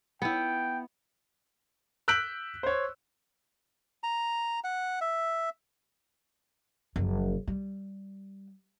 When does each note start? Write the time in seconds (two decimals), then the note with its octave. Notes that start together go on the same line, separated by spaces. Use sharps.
0.22 B3 E4 G5
2.08 E6 F#6 G6 B6 D7 F#7
2.63 C5 C#5
4.03 A#5
4.64 F#5
5.01 E5
6.96 F#1 F3
7.47 G3